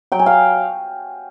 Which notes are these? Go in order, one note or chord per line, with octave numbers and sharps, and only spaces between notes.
F#3 G5
G#5
F5 G5